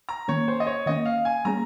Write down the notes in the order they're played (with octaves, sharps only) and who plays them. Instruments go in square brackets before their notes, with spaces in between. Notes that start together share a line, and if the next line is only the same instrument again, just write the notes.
[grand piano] A#5
[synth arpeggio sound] D#3 A#3 C#4 [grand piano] C#5
[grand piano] C5
D#5
C#5
[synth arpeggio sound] D#3 A#3 C#4 [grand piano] D#5
[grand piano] F5
G#5
[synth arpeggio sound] G3 A#3 C#4 G#4 [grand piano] A#5